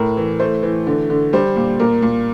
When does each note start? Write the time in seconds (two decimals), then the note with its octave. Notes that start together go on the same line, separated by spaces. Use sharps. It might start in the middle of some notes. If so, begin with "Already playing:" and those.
Already playing: A2 A#4
0.17 E3
0.40 A3 C5
0.63 E3
0.87 D3
1.10 D3
1.33 G3 C5
1.56 A#2
1.80 A#2 A#4
2.02 A#2